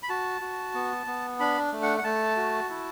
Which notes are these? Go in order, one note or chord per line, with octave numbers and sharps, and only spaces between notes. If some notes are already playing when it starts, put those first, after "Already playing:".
B5
F#4 A5
F#4
B3
B3
D4 B5
A3
F#5
F#5
A3 A5
F#4
E4